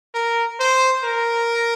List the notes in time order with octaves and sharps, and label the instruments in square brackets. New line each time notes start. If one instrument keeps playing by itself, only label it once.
[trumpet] A#4
C5
A#4